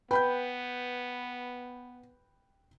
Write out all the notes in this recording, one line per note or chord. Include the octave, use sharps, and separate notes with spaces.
B3 B4 G5 B5 G6